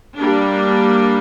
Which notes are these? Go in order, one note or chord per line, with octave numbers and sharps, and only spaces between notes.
G3 A#3 D4